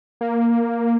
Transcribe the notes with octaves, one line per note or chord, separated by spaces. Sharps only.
A#3